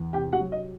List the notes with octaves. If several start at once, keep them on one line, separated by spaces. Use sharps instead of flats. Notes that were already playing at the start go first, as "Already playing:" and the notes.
Already playing: E2
C3 G4 G5
F#4 F#5
F#3
D#5